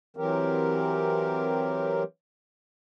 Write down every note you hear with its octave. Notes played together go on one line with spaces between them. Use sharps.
E3 F#3 C4 G4 A#4